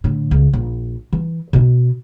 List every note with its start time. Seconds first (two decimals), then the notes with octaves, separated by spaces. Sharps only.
0.04 A2 D3
0.31 C#2
0.54 A#1
1.13 E3
1.53 B2 D#4